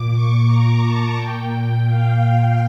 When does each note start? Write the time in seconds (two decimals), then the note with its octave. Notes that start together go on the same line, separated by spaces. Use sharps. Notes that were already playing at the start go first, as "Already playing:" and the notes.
Already playing: A#2 D6
0.11 C#6
0.46 A#5
0.80 A5
1.15 A#2 G5
1.51 G5
1.85 F5